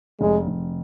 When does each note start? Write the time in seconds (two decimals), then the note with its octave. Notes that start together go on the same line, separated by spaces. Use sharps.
0.21 F1 G#3
0.48 F1